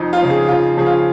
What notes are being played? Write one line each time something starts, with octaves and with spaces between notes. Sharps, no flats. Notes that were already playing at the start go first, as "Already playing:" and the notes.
Already playing: F2 D#4
F4
C#3 F3
G#4
F2 F4
C#3 F3 G#4
F4